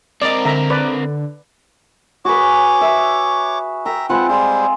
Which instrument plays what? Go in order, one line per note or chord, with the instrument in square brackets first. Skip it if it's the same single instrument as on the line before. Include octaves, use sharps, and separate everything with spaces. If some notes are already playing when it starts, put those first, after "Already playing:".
[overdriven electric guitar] C4 A#4 [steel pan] D5 D#5
[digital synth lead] D3 [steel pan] E5 A#5
[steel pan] B4 D5
[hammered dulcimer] F#4 G#4 B4 [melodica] C#5 D6
[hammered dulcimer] E5
[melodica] E5 A#5 [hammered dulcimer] G5
[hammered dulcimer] G#3 C4 F4 [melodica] B4 F#5
[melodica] G3 G#3 C5 [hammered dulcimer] F4